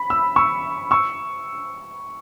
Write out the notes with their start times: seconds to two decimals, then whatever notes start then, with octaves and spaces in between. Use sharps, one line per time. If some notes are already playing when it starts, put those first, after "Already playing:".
Already playing: B5
0.10 E6
0.36 C#6 E6
0.91 C#6 E6